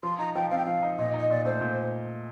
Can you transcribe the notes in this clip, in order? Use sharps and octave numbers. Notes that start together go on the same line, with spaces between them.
F3 C6
D#4 A#5
F3 G5
C4 F5
G5
F3 F5
D#4
A#2 D#5
D#4
D#5
A#2 D5
A3 C5
A#2